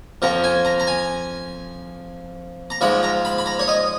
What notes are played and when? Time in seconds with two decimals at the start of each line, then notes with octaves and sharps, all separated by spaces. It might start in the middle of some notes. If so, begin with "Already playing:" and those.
0.22 F2 F3 A#5
0.44 G#5
0.65 A#5
0.80 A#5
0.87 G#5
2.70 A#5
2.81 G#2 F3 B5
3.03 A#5
3.25 B5
3.38 B5
3.46 A#5
3.59 C#5
3.68 D#5